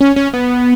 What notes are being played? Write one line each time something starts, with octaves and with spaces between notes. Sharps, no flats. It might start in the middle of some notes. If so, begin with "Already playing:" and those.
C#4
C#4
B3